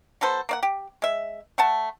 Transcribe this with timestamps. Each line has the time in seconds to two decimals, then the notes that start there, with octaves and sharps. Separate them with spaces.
0.21 F#3 B3 A4 C5
0.49 A#3 D5 F#5
0.63 G4
1.02 G#3 E5
1.58 A3 F#5 A5